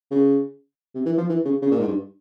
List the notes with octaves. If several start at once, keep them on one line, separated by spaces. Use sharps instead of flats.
C#3
C3
E3
F3
E3
C#3
C#3
A#2
G#2
G2